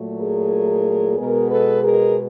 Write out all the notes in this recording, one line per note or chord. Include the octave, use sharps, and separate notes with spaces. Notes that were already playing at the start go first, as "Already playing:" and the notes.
Already playing: A#2 F#3 A3
G#4 A#4
B2 G#3 B3 G#4 A#4
A4 B4
G#4 A#4